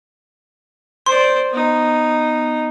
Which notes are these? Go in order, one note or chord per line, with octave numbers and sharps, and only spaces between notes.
C5 D5 C6
B3 D#4